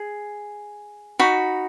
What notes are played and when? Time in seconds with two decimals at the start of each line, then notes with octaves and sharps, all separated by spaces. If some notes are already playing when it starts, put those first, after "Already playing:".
Already playing: G#4
1.19 D#4 F#4 B5